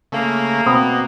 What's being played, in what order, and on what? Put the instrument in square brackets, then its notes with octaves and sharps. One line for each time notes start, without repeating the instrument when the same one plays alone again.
[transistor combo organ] C#3 A3 [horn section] A#3
[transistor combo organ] B2 [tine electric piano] C4 [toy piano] B5 D#6